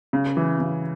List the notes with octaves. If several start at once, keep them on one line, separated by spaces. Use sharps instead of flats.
C#3
E3
C#3